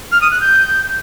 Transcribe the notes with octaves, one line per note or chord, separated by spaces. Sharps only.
F6
D#6
F#6
G6